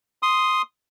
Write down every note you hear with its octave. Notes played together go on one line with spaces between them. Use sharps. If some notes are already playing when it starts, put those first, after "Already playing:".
C6 D#6